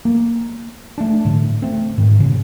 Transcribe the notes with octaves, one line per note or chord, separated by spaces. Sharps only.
A#3
A3 D4
A2 D3
A3 C4
G#2 D#3
A#2 C#3